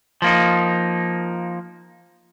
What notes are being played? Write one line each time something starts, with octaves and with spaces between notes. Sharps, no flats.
F3 A#3 D#4